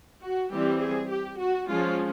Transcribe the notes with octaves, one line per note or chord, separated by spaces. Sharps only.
F#4
E3 G3 C4 G4
G#4
G4
F#4
F3 G#3 C#4 F4